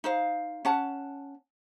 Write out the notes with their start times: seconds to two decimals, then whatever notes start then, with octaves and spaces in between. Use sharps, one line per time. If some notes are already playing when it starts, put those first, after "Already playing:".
0.04 D#4 C5 F5
0.65 C#4 F#5 A5